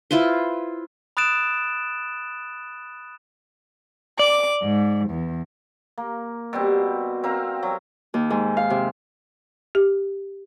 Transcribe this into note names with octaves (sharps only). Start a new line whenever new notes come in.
E4 F4 B4 C5
B5 D#6 F#6 A6 D7 E7
D5 D6
G#2
E2
A#3
B2 G3 C4
C4 A#4 F5
F#3
D#2
G#2
F5
C3
G4